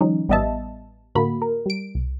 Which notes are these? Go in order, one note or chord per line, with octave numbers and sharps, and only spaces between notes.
D#3 F3 G3 C#4 D#4
A1 G3 B3 D#5 E5 A5
A2 D3 A#3 F#4 B5
A#4
G3 D7
C2